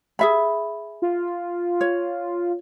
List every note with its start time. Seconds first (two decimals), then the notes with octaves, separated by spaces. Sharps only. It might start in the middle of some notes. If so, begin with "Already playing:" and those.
0.19 G#4 E5 B5
1.02 F4
1.81 C#5